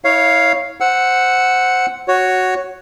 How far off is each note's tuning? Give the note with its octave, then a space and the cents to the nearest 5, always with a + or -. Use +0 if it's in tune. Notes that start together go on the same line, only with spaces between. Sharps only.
E4 -30 C#5 +0 F5 +0
C5 +0 F#5 +0 E6 +0
F#4 +0 C#5 +0